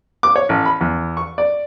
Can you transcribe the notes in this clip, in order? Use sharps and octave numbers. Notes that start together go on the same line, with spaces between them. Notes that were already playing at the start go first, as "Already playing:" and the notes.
D6
C#5
A1
B5
E2
C#6
D5